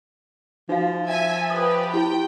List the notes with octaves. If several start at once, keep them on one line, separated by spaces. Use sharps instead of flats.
F3 D#4 F#4 F5
E5 G#5
G4 B4 D#6
E4 G4 G5